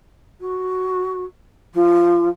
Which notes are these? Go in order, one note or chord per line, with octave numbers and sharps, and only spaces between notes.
F#4
F3